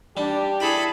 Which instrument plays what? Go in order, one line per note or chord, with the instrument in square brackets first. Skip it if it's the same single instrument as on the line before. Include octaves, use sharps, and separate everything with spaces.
[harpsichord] G3 [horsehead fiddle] D4 [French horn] G4
[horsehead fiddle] E4 [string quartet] G#4 A4 B5